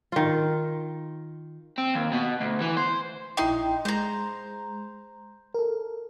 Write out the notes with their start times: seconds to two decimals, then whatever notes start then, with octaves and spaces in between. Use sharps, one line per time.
0.12 D#3 F4
1.78 C4
1.95 D#2
2.12 B2
2.40 D2
2.61 E3
2.77 C5
3.37 A#1 D#4 E4 G5 C6
3.85 G#3 C5 A#5
5.54 A4 A#4